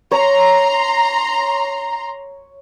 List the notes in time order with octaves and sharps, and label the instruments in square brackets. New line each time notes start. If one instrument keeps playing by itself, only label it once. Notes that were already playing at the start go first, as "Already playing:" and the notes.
[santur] C#5 [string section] A#5 C6